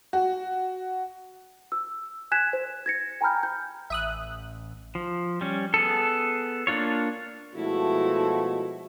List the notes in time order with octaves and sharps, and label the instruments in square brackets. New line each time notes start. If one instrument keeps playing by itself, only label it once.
[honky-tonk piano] F#4
[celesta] E6
G#5 F#6 G#6 B6 E7
C5
G#6 A#6 C#7
G5 G#5 A#5 B5 F6 G6
G6
[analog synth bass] A1 [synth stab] E5 D#6 F#6
[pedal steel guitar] F3
G3 C#4
B3 G#4 A4
A#3 D4 F4 C#5
[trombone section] B2 F3 A3 [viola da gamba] G#3 E4 F#4